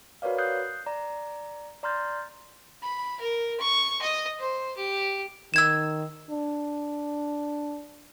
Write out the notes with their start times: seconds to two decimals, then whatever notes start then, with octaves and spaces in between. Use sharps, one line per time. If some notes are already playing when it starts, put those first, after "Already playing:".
0.22 F#4 A#4 B4 C#5 D5 F5
0.38 D#6 F#6 G6 C7
0.86 D5 A#5
1.83 D5 A#5 C6 F6 G6 A6
2.83 B5
3.20 A#4
3.60 C#6
4.01 D#5
4.39 C5
4.76 G4
5.54 D#3 E6 G#6 E7
6.31 D4